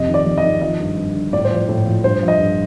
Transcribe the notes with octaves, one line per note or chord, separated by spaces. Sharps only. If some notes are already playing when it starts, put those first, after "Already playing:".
Already playing: F2 C3 D#5
D#3
D5
F2
D#5
D#3
F3 D#5
G2
G2
D3
A2 D5
C5
F3
D5
A2
F3
G2 C5
F3
D#5
G2